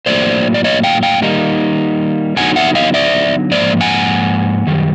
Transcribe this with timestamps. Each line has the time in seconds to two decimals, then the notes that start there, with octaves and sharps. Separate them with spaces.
0.06 A2 F#3 A#3 C5 D5
0.54 D5
0.64 C#5 D#5
0.83 F5 G5
1.03 F5 G5
1.22 D#3 G3 A#3 D#4
2.37 D3 F#3 B3 D#4 F#5 G#5
2.56 E5 F#5
2.75 D#5 F5
2.94 D5 E5
3.51 G#2 F3 A#3 C5 D5
3.81 F#5 G#5
4.67 F#2 D#3 G3